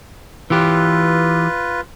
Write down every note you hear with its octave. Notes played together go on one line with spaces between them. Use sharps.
E3 F4 G4 B4